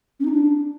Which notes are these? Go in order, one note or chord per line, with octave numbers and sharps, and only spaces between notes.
C#4
D#4
D4